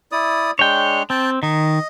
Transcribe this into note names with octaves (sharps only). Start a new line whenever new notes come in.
E4 D5 D#6
G#3 D4 C#5 G5
C4 G5 A5
D#3 D#5